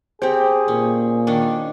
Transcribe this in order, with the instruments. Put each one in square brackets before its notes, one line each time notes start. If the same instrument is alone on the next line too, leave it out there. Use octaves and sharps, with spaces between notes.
[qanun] C4 G4 [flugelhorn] G#4 [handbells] C5
[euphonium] A#2 [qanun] C#4
[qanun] D#3 C#4 D4